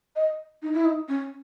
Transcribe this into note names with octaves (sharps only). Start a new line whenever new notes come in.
D#5
D#4
E4
D#4
C#4